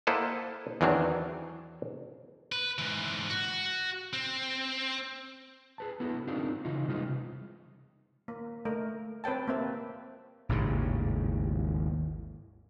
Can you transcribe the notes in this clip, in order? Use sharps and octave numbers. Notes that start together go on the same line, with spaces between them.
A#3 E4 A4 C5 D#5 F#5
E2 D#3 E3 F#3 C4 D4
B4
G#2 E3
F#4
C4
G#4 B4 A5
B3 E4 F#4 A4
C4 D4 D#4 F4 G#4 A#4
C#3 E3 D#4 F4
C3 G3 G#3 B3 D#4 F4
A#3
A3 A#4
C4 B4 C#5 G5 A5
A#3 C4 E5
G#1 D#2 A2 C#3